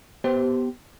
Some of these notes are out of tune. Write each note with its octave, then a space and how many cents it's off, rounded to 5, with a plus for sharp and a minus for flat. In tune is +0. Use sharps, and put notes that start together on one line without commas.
B3 +0 G4 -15 C5 +0